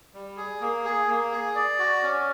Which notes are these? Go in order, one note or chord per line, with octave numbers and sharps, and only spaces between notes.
G3
G#4
A#3
G#4
A#3
G#4
D5
F#4
C#4